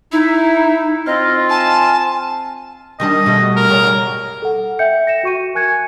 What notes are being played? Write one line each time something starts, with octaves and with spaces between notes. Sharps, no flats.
D#4 E4
C4 F4 D#5
G#5 A5
D#3 G3 D4 D#5
B2 G3 A3
A#4
C#3 G3
F#4 D5
A4 F#5
E5 G5 G6 C#7
A#6 C#7 E7
F#4 C#6 D#7
A#4 G#5 F#6 G#6 C#7